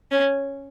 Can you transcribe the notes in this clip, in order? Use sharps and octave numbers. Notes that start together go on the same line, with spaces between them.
C#4